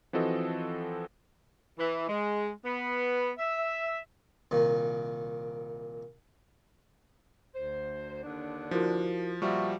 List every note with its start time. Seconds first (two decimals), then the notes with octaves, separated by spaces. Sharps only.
0.13 E3 F3 C4 F#4 A4 D#5
1.79 E3
2.08 G#3
2.64 B3
3.38 E5
4.51 C2 A#2 D#3
7.55 D2 C5
8.24 D#2 D3 D4
8.71 F3 E4 F#4 A#4
9.42 A#2 F3 G3 B3 F#4 E5 C#6